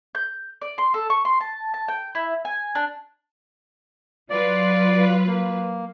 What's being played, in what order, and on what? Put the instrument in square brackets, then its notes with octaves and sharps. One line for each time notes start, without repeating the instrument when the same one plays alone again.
[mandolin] G6
D5
C6
A4
C#6
C6
A5
A5
G5
E4
G#5
D4
[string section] F#3 F4 B4 [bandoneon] D5
[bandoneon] A#3